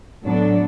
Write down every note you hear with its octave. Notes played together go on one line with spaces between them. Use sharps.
A2 F#3 B3 D4 A4